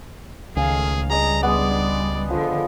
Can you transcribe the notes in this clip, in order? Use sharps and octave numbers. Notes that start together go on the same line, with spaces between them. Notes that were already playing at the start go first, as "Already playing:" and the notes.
C#2 D#3 A3 G#4 F5 G#5
G3 D4 G#4 D#5 A#5
G#3 B3 D5
D3 F3